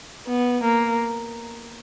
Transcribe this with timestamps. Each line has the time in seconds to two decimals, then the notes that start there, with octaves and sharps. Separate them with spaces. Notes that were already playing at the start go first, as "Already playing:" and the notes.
0.28 B3
0.64 A#3